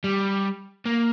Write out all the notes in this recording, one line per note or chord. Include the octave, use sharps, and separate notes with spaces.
G3
A#3